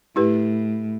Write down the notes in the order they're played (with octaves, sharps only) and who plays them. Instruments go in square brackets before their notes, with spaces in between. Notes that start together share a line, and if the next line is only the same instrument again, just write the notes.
[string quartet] A2 [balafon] E4 G4 B4